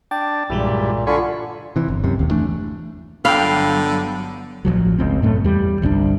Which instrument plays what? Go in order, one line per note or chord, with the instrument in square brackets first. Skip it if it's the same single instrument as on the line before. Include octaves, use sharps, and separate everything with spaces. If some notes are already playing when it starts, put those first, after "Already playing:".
[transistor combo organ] D4 A5 [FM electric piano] G5
[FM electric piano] B1 F#3 G#3 [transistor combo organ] G2 E3 [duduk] A#2
[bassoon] D3 [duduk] F4 [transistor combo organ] G#5 B5 C#6
[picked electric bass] C3 E3
G1
C#2 F#2 C3
D#1 D#2
E3 A3 D4
[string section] G1 F#3 B3 [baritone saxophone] D3 [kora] F5 [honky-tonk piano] G5 B5
[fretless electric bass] A1 C3 F3 F#3
F#1 C#2 C4
F#2 A2 A3
E2 G3
G1 C2 C#4 D4